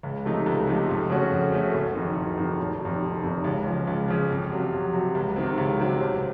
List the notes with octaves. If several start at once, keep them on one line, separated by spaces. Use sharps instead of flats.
C#2
C3 F3 A3 D#4
C#2
C3 F3 A3 D#4
F2
C#3 A3 C#4 F#4
F2
C#3 A3 C#4 F#4
F#1
F2 D#3
F#1
F2 D#3
F1
F2 C3 D#3
F1
F2 C3 D#3
C#2
C#3 F3
C#2
C#3 F3
F2
C3 F#3
F2
C3 F#3
C#2
C3 D#3 F#3 C4
C#2
C3 D#3 F#3 C4
A1